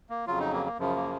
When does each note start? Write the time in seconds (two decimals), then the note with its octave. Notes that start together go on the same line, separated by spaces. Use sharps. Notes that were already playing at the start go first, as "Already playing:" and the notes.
0.10 A#3
0.27 F2 C#3 F#3 F4
0.40 D#4
0.53 A#3
0.66 A#3
0.78 F#2 C#3 F3
0.96 A#3